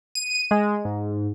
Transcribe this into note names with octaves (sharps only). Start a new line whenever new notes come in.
D#7
G#3
G#2